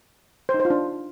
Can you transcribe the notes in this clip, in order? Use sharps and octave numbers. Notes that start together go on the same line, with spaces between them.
C5
D#4
C5
F4
D4